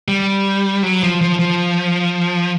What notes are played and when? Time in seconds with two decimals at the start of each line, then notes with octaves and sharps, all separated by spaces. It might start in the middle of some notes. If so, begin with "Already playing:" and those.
0.08 G3
0.83 F#3
1.03 F3
1.21 F3
1.39 F3